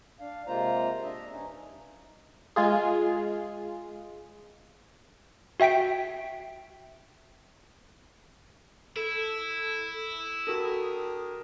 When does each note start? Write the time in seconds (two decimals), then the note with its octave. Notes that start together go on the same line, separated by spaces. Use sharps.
0.19 D4 F5
0.47 C3 G#3 A#3 F4 C5 A#5
1.03 D4 D#5 E5
1.32 G2 C#4 D#4
2.56 G#3 F4 G#4
5.60 F#4 E5 G5 B6 D7
8.96 E4 A4
10.47 D4 F#4 G4 A4 A#4 D#6